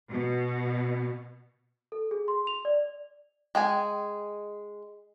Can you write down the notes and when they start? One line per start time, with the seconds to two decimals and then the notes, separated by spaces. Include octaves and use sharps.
0.10 B2
1.92 A4
2.11 G#4
2.28 C6
2.47 F7
2.65 D5
3.55 G#3 G5 G#5